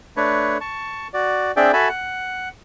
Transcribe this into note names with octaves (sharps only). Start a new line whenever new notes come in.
A3 D4 B4 C#5
A5 C#6
F#4 D5
C4 D4 G#4 D5 E5 G5
F#4 A4 E5 G#5 A5 B5
F#5